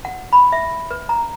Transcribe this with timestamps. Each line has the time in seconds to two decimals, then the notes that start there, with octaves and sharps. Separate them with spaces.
0.05 F#5
0.33 B5
0.52 E5
0.91 B4
1.09 A#5